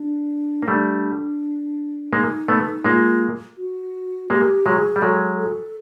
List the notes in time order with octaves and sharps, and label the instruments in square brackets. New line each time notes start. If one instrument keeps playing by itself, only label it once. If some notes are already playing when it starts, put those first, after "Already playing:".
Already playing: [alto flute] D4
[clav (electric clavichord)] A#3 [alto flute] D#4
[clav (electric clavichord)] G3 A3 [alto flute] D4
[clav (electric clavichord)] G#3 A#3 [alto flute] D#4
[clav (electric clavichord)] A3 B3
[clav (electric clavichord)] G#3 A#3 [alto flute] F4
[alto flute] F#4
[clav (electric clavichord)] G#3 A#3 [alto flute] G4
[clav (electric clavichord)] F#3 G#3 [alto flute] G#4
[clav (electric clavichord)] G3
[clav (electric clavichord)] F#3 G#3 [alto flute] A4
[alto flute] A4